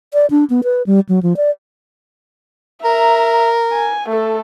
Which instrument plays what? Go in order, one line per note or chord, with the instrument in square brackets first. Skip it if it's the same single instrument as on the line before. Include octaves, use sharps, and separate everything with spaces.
[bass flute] D5
D4
B3
B4
G3
F#3
F3
D5
[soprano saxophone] A#4 [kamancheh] E5 A#5
[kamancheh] G#5
A3 A4